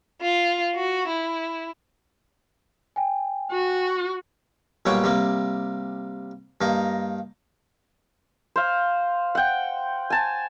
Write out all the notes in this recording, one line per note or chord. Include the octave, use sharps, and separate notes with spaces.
F4
F#4
E4
G5 G#5
F#4
B1 A#2 G3 C#5 F#5 G5
C3 G3 A#3
G2 A#3 D#4
C5 F5
F#5 G5
G#5 A5